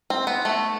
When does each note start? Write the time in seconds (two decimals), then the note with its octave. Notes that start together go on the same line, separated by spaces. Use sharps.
0.10 C4
0.27 B3
0.45 A3